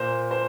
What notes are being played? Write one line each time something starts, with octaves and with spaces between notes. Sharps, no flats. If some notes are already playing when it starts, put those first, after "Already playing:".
Already playing: A#2 C5
C5